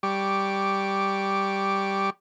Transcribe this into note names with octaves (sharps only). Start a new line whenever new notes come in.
G3 G4 C#6 D6